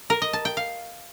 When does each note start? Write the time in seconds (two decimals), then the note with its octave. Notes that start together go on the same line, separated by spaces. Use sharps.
0.10 A#4
0.22 D#5
0.33 A5
0.45 G5
0.57 F5